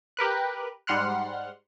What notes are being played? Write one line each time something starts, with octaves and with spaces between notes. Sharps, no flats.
G4 A#4 B4 F#6
G#2 G3 F#5 C6 F6 F#6